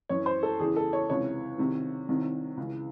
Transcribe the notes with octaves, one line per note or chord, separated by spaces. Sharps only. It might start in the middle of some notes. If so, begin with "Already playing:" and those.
F#2 E3 C#5
C5
A4
E2 C#3 E3 G#4
A4
C#5
C#2 C3 E3 C#5
C2 C3 D#3
C2 C3 D#3
C#2 C#3 E3